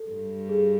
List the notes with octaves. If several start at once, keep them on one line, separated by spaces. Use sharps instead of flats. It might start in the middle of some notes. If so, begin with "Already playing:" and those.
Already playing: A4
G2
G#4